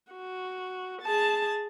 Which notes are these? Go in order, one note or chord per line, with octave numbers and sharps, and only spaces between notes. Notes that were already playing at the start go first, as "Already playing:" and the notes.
F#4
G#4 A5